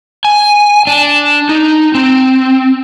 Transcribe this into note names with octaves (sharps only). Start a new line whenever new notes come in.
G#5
D4
D#4
C4